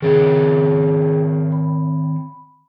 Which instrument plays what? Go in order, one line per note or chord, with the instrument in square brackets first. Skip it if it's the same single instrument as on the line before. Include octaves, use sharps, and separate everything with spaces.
[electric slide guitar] D#3 C4 C#5 [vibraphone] G#4
[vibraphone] B5